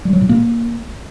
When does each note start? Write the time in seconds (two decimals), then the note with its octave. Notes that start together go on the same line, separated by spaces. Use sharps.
0.05 G3
0.13 F#3
0.21 A#2
0.29 A#3